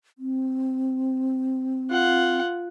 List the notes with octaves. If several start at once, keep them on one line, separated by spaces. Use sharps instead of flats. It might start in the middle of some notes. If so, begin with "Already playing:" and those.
C4
F4 F#5